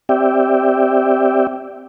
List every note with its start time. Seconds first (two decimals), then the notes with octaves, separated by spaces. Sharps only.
0.09 C4 G4 D5 E5 G5